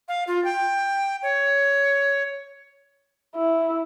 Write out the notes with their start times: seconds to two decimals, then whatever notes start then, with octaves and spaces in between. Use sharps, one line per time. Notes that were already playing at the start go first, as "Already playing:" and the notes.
0.08 F5
0.27 F4
0.45 G5
1.23 C#5
3.36 E4